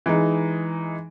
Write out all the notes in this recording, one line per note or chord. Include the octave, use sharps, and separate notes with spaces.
E3 G#3 D#4